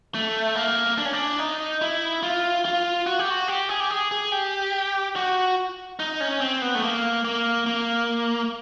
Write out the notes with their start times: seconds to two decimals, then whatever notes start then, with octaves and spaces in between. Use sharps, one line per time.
0.14 A3
0.55 A#3
0.98 D4
1.05 C#4
1.13 D4
1.39 D#4
1.81 E4
2.23 F4
2.65 F4
3.06 F#4
3.19 G4
3.30 F#4
3.48 G4
3.69 G#4
3.80 G4
3.90 G#4
4.11 G#4
4.32 G4
5.16 F#4
5.99 D#4
6.20 C#4
6.40 C4
6.62 B3
6.74 A3
6.83 A#3
7.25 A#3
7.66 A#3